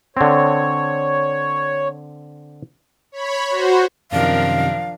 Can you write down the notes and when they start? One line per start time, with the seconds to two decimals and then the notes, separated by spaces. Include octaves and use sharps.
0.17 D3 C4 C#5
3.12 C#5 B5
3.50 F#4 C5
4.12 F#2 C3 D#3 F3 D4 A#4 F5